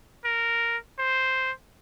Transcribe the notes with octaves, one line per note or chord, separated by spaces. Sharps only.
A#4
C5